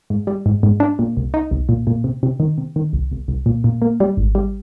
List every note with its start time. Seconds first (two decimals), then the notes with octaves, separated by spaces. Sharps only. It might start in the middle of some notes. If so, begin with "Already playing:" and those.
0.10 G#2
0.27 G3
0.46 G#2
0.63 G#2
0.80 D4
0.99 A#2
1.17 C2
1.34 D#4
1.51 C2
1.69 A#2
1.87 A#2
2.04 C3
2.23 C3
2.40 D#3
2.58 C3
2.76 D#3
2.93 C2
3.12 C2
3.28 C2
3.46 A#2
3.64 A#2
3.82 A#3
4.00 G3
4.17 G#1
4.35 G3